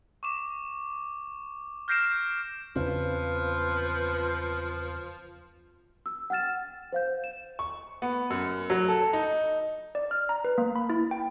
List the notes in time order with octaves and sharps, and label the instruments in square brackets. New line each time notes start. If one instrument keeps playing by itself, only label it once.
[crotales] C#6 D6 E7
F6 G6 A#6 C7 D7 E7
[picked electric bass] E2 C#3 C4 [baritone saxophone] F3 [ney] B4
[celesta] E6
F#5 G5 F6 A6 E7
C5 F5 G6
E7
[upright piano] C#6
B3
F#2
F#3
A4
D#4
[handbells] D5
F6
A#5
B4
A#3
B5
E4
G5